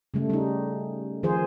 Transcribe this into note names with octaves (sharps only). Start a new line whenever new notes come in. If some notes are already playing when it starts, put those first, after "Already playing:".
C#3 G3 A3
G3 D#4
D#3 F3 F4 G#4 C5